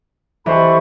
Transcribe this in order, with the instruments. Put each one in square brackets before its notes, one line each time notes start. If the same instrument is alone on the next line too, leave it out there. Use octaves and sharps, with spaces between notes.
[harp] E3 [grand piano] G4 C5 D#5 [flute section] A4 B5 C#6